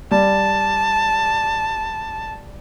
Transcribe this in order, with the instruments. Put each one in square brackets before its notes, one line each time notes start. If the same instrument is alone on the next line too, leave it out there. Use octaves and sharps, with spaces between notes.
[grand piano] G3 [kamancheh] A5